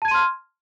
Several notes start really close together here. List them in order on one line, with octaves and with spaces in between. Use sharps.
A5 G#6 D#7 C6 F6